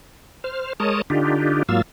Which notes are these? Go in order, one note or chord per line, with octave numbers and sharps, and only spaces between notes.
C5 F6
G#3 A#4 C#5 A5 D#6
D3 D4 D#4 F4 G4
G#2 F#3 A#3 F4 F5 E6